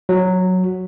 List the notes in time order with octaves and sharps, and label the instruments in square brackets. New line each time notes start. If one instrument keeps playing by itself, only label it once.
[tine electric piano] F#3